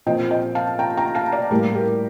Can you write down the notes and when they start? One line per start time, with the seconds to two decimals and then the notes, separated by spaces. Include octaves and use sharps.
0.06 A#2 F3 C4 D#5 G5
0.31 D#5 G5
0.55 F5 A5
0.79 G5 A#5
0.97 G5 A#5
1.15 F5 A5
1.32 D5 F5
1.50 A2 G3 A#3 G4 A#4
1.75 G4 A#4